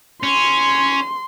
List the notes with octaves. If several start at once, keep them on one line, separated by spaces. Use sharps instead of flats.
C#4 C6